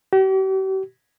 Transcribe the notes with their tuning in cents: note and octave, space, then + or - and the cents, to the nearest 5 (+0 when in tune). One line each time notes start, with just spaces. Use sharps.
G4 -45